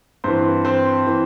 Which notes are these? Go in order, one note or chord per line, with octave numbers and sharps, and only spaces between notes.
G2 E3 C4 C5
C4 C5
E3